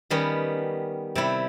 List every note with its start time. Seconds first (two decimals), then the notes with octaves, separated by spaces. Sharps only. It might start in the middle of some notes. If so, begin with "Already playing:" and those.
0.10 D#3 G3 B3 C#4
1.15 C3 G3 E4